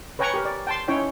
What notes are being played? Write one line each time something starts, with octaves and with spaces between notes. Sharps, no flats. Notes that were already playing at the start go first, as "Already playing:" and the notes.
B4 C#5 G5 G#5 A#5 C#6
G4 A#4
D5
G5 A5 C6
C#4 D#4 E4 C#5 G5